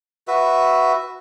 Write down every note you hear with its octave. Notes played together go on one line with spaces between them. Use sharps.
F#4 B4 E5